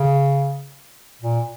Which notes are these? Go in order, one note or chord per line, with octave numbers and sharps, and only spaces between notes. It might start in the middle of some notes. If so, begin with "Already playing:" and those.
Already playing: C#3
A#2